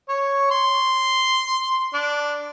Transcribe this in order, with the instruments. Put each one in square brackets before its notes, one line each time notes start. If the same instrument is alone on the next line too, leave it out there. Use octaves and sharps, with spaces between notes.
[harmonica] C#5
C6
D4